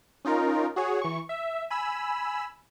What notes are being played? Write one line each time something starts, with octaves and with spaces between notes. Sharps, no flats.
C#4 D#4 F4 A#4
F#4 G#4 C#5
E3 C#6
E5
G#5 B5 E6